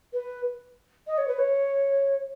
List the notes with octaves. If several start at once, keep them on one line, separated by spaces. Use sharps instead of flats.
B4
D#5
C#5
B4
C#5